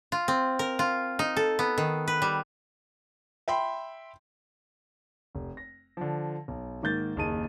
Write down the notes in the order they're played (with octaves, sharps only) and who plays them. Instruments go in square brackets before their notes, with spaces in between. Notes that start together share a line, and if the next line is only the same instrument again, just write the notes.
[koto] F4
C4
A#4
F4
D#4
A4
B3
D#3
B4
G3
[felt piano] E5 G5 B5 C6
[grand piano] F1
A#6
D3 F3
B1
G#2 D#3 A#3 G6 A6
F#1 D#2 D#4 G#4 A5 D#7